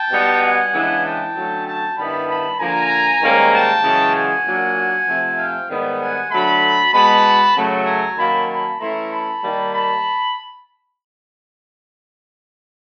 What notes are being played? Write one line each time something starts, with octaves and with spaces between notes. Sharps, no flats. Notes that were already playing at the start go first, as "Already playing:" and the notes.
Already playing: G5 A5
B2 G3 B3 D#4
F#5 G#5
C#3 E3 G#3 B3 D4
G5 A5
D3 F#3 A3 C#4
G5 A5
G2 D#3 G3 B3 E4 A5 B5
A5 B5
D3 F3 A#3 G#5 A#5
G#2 D#3 G3 A#3 C#4
G5 A5
F#2 C#3 E3 G#3 C#4
F#5 G#5
A#2 F#3 A#3 D4
C3 F3 A3
F5 G5
G#2 D#3 G3 B3
F#5 G#5
D3 F#3 A3 A5 B5
B2 G#3 B3 A5 B5
F#2 C#3 F#3 A3
G#5 A#5
D#3 F#3 A#3 C#4 A5 B5
A5 B5
E3 A3 C#4 E4 A#5 C6
A5 B5
D#3 G3 A#3
A5 B5